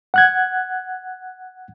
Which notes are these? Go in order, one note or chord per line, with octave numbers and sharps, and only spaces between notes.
F#5 F#6 G#6